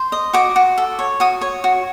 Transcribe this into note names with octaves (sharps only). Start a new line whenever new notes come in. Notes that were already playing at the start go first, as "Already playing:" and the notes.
Already playing: C5
D#5
F#4 D6
F#4
A4
C#5
F#4 D#6
C#5
F#4